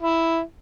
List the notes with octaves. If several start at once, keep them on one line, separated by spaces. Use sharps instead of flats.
E4